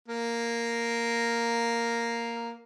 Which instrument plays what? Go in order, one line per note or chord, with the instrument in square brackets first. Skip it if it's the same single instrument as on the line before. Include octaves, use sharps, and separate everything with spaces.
[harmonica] A#3 A#4